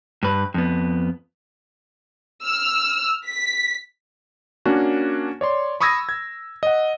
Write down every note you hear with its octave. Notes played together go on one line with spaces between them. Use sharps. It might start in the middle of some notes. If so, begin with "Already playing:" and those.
G2 B4
F2 B3
E6 F6
B6
A#3 C#4 D4 F#4
C#5 D5 C6
B5 C#6 D#6 E6 G#6 A#6
G#6
D#5 F#5